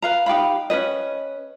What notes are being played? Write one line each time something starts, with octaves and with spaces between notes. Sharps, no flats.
B4 F5 A#5
D#4 G4 F5 B5
C#4 D4 B4 D#5